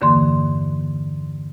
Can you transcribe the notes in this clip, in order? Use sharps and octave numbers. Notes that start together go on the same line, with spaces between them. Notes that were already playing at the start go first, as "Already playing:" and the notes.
E2 G2 D3 E3 A#3 C6